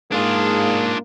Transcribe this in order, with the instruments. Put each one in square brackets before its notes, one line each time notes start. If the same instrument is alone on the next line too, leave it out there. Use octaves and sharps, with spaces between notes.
[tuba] G#2 [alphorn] A#3 [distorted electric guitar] D4 F4 [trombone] G#4